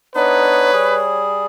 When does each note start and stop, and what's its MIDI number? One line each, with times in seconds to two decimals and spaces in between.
0.15 0.71 59
0.15 0.71 62
0.15 0.71 63
0.15 1.01 71
0.15 1.21 73
0.73 1.46 55
0.73 1.46 68